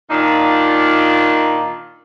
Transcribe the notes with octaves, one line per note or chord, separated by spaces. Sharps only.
A#2 D#3 D4 D#4 F4